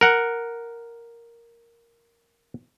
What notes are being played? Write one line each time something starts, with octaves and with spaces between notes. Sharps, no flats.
A#4 F#5